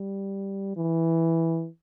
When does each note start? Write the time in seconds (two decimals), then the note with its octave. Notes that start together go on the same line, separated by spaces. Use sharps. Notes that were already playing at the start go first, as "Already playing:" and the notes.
Already playing: G3
0.76 E3